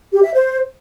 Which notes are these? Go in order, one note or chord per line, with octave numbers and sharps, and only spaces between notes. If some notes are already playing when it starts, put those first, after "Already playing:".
G4
E5
C5